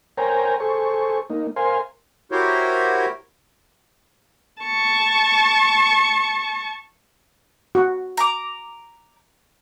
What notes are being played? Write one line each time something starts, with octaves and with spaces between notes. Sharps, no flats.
A#4 C5 C#5 G5 G#5 A#5
G#4 A4 C5 C#6
A#3 D#4
A#4 C5 F5 G#5 C6
E4 F#4 G4 A#4 C5 C#5
A5 C#6
F#4
A#5 D6